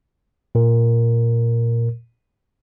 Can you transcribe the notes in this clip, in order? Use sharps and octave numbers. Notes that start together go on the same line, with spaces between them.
A#2 A#4